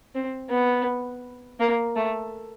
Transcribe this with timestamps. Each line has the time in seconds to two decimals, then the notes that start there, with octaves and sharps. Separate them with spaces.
0.15 C4
0.50 B3
1.60 A#3
1.96 A3